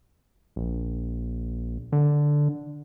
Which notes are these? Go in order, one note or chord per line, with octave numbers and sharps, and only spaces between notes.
A#1
D3